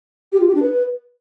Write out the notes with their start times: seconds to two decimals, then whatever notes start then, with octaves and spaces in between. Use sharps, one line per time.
0.33 G4
0.40 F4
0.47 G4
0.55 D4
0.62 B4